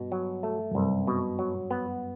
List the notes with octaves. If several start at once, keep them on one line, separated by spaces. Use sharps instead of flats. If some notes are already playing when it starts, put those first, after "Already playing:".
Already playing: G2 B2
F#3
A3
F#2
C2 G2
B2
F#3
B3